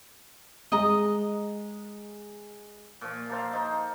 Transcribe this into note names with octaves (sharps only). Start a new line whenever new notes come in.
G#3 D#5 A#5
A#2 F3
A#3 A4 C5 F5
D#4 C5